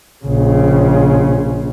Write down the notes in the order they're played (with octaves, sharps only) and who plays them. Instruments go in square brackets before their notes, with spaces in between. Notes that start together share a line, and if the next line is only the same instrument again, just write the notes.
[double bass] A#1 C#3